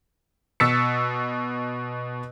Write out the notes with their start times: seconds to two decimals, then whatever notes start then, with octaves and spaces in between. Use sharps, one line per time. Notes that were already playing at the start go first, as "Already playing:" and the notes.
0.60 B2 E6 A6 B6 C#7